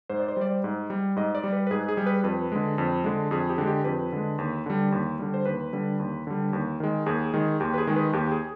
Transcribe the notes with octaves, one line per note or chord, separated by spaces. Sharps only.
G#2 C5
D5
C5
G3 D5
C5
G#2
G3
G#2 D#5
D5
G3
B4
B4
G#2 G#4
G#4
G3
B4
F2 B4
D3 G#3
F2
D3 G#3
F2 G#4
G4
D3 G#3
G4
F2 B4
D3 G#3
D#2
D3 G3
D#2
D3 G3
C5
D#2 B4
D3 G3
D#2
D3 G3
D#2
D#3 G#3
D#2 G#4
D#3 G#3
D#2 G4
B4
G#4
D#3 G#3
B4
D#2 G4
G#4